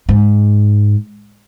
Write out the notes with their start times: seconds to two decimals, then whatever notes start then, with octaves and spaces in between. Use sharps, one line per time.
0.09 G#2